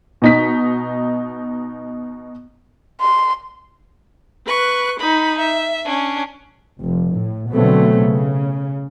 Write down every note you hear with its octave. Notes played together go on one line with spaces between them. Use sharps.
B2 D#4 B6
C6
B4 C#6 F#6
D#4 B5
E5
C#4 D4
F1
A2
B2 D3 F#3 A3 B3 C4
C#3